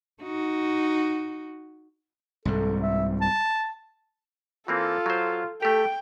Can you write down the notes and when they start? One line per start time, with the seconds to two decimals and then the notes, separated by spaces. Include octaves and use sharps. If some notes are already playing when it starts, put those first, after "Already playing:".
0.22 D#4 F#4
2.45 C2 G#2 A4
2.82 E5
3.20 A5
4.68 E3 A#3 C4 F4 A4
5.06 F#3 C5
5.62 A3 G4 A4 G5